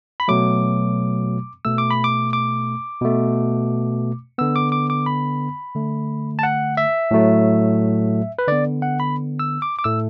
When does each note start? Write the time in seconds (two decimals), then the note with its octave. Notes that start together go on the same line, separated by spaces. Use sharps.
0.20 B5
0.28 B2 F#3 A3 D6
1.65 B2 A3 E6
1.78 D6
1.91 B5
2.04 D6
2.33 D6
3.02 B2 A3
4.38 D3 B3 E6
4.56 D6
4.72 D6
4.90 D6
5.06 B5
5.75 D3 A3
6.39 A5
6.43 F#5
6.77 E5
7.11 A2 F#3 A3
8.39 B4
8.48 D3 B3 D5
8.82 F#5
9.00 B5
9.39 E6
9.62 D6
9.79 D6
9.84 A2 A3 E6